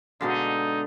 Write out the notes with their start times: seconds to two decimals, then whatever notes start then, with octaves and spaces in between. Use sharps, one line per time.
0.21 B2 D3 G#3 D#4 F5